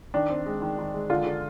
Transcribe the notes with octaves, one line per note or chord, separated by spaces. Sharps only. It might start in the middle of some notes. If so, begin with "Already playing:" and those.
D#3 D4
C4
G#3
D#3
D#3
G#3
D3 F4
D3